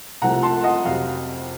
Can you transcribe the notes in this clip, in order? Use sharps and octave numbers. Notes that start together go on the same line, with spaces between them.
C2 C3 F3 A3 F#5 A#5
A5 C6
D#5 F#5
F2 C3 F#3 F5